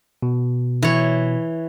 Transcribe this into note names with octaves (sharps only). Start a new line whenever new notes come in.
B2
E3 C#5